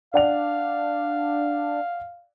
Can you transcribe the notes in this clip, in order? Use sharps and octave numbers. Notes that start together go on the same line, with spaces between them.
D4 D5 F5 F#5 F7